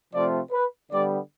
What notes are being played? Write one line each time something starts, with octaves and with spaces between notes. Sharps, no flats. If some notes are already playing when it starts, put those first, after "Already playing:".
C3 F3 A3 C4 F4 D5
B4
D3 G3 B3 D5